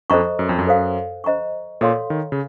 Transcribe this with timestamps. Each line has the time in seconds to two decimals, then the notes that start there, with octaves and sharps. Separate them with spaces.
0.10 F2 A4 C5 D#5 A#5 C#6
0.39 F#2
0.49 F2
0.59 F#2
0.67 A4 C5 F5
1.24 C5 D#5 A#5 C#6
1.81 A#2 A4 C#5 F5 C6
2.10 D#3
2.32 C#3